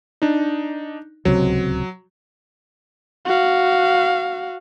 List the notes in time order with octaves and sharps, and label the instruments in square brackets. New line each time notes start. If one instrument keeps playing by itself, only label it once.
[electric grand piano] D4 D#4
[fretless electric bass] D1 C#2 C3 [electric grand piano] F#3
[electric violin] F#4 F5